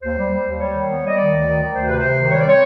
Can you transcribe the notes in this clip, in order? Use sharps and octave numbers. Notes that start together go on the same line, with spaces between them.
D#2 C5
G3
G3
D#2
G3 C#5
D#3
B3
G3 D#5
D#3 D5
D2
D#3
D#3
D2 C5
C3 B4
C3 C5
D#3
G3 C#5
D5
C4 C#5